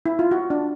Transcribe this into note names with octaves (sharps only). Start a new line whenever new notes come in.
E4
F4
F#4
D4